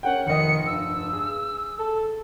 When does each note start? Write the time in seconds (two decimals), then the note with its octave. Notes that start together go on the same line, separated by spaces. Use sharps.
0.03 C#4 A#4 F#5 G5
0.27 F1 D#3 D#5 C#7
0.66 G2 E6
1.13 G#4
1.79 A4